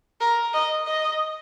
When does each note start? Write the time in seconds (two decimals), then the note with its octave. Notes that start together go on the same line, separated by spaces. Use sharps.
0.21 A#4
0.54 D#5
0.87 D#5